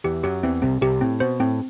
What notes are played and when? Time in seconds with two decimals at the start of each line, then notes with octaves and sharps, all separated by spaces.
0.04 E2 E3 G4
0.23 F#2 F#3 G4
0.43 E2 E3 C4
0.62 C2 C3 C4
0.81 C2 C3 G4
1.01 A2 C4
1.20 B2 C5
1.40 A2 C4